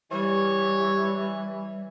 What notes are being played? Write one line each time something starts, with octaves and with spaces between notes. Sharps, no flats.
E3 G3 G4 C#5